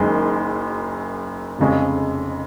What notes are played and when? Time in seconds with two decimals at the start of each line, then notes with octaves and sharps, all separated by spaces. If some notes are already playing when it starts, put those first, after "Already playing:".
Already playing: F#1 F#2 D#3 G#3
1.59 F1 F2 C#3 G#3